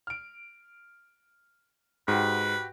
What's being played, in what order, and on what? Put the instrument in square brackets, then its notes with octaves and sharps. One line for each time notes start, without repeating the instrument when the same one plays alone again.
[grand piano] F6 D7
[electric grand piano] G#2 [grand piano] F#4 G4 [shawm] B4